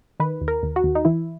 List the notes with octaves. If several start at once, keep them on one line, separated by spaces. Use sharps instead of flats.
D#3 B4
D#2
A#4
D#2
F#4
D#2
D#4
E3 E4